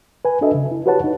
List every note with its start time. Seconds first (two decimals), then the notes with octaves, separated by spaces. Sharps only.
0.25 B4 G#5
0.41 D4 F#4 A4 D#5 E5
0.54 C#3
0.71 E4
0.86 F#4 G4 B4 C#5 F#5 A5
1.04 D#4